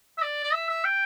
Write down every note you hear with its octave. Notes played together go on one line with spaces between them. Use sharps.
E5
D5
D5
E5
E5
G5